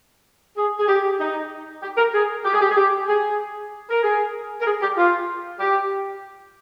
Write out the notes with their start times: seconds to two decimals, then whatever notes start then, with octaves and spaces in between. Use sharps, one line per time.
0.56 G#4
0.80 G#4
0.88 G4
1.19 D#4
1.82 G4
1.97 A#4
2.14 G#4
2.45 G4
2.53 G#4
2.62 G4
2.70 G#4
2.77 G4
3.08 G#4
3.90 A#4
4.03 G#4
4.61 A#4
4.66 G#4
4.81 G4
4.97 F4
5.60 G4